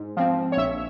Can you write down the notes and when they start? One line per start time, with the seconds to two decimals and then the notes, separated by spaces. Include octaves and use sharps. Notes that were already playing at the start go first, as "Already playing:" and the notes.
Already playing: G#2
0.17 F3 C4
0.52 C#5
0.57 A#1 E5